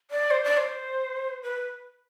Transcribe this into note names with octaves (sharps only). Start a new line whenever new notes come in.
D5
C5
D5
C5
B4